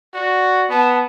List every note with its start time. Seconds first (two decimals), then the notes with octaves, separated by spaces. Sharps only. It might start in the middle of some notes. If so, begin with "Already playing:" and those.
0.14 F#4 D5
0.70 B3 A5